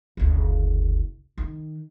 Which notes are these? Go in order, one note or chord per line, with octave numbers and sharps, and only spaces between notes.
F#1 D2
D#3